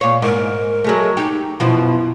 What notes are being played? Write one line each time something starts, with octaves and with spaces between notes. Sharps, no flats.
A#2 C#5 F5
G#2 A#4
F#3 G#3 A3
D#4 G4
F#2 B2 F3 E4